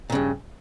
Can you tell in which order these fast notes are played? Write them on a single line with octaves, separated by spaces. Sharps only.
A#2 C#3 G2